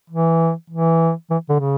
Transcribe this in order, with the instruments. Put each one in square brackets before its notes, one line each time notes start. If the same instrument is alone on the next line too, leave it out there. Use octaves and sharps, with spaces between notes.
[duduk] E3
E3
E3
D3
C#3